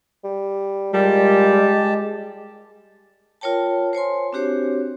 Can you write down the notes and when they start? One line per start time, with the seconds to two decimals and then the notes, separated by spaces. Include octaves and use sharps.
0.24 G3
0.94 A#2 G3 G#3 G4 A5
3.41 F4 A#4 C#5 G5 A5
3.93 C5 C#5 G#5 C6
4.33 C4 D4 F#4 G4 C5 C#5